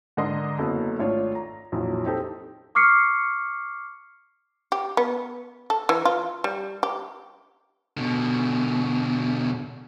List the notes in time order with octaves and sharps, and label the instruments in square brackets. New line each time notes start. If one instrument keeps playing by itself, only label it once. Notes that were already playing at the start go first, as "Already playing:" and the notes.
[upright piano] G#2 D3 D4 A#4 D#5 C6
F#1 F#2 B3 A4
G#1 A3 D4 F4 C#5
A#5
A#1 F2 E3 F#3
C4 D#4 G4 A4 C5
[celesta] C#6 D6 F6 C7 C#7
[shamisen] G4
B3
A4
E3
F4
G3
G4
[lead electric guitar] B2 D3